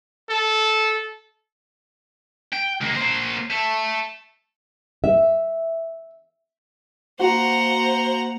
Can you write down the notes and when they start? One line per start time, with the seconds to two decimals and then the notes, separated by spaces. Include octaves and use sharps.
0.29 A4
2.53 G5
2.81 C#2 A#3
2.96 A#3 C5
3.50 E5 A5
5.04 E5
7.20 A#3 F#4 C5 F#5 A#5